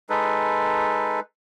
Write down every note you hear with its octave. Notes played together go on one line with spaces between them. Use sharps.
G#3 D#4 A4 B4